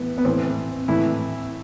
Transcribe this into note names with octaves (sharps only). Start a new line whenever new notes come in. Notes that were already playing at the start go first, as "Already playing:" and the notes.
Already playing: A2 E3 B3
B3
A2 E3 C4
A2 E3 E4